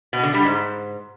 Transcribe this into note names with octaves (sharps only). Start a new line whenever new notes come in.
B2
D3
G3
G#2